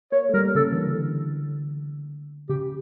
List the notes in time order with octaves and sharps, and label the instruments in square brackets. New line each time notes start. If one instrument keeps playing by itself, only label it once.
[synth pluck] A#3 [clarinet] C#5
[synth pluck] A3
[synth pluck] G3 [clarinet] A#4
[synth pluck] C#3 [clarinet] A4
[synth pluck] E3
D3
[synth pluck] C#3 [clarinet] G4